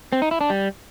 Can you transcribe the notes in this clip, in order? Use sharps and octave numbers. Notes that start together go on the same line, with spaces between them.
C4
D#4
E4
D4
G3